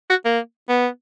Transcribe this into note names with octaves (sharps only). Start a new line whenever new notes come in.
F#4
A#3
B3